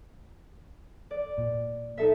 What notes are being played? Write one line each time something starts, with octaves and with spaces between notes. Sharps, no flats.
D5
A#2
D#4 A4 E5